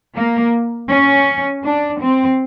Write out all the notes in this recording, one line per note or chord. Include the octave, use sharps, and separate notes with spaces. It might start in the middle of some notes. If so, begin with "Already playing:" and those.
A#3
C#4
D4
C4